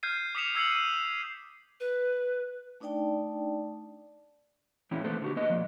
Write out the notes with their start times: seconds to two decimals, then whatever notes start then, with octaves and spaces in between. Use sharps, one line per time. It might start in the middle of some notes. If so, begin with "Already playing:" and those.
0.03 F6 G6 G#6 C7 D#7
0.35 D6 D#6 B6 C#7 E7 F7
0.55 D6 E6 G#6 C7 C#7 F#7
0.72 D#7
1.80 B4
2.80 A3 D4 D#4 D5 G5 A5
4.91 E3 C4 C#4 E4
5.04 A3 A#3 A4 B4 C5
5.22 D3 F#4 G4
5.36 A#3 B3 D#5
5.50 F3 A#3